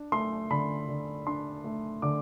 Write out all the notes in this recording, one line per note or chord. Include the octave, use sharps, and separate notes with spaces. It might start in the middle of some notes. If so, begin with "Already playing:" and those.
Already playing: D4
A3 C6
D3 B5
D3
D4 C6
A3
D3 D6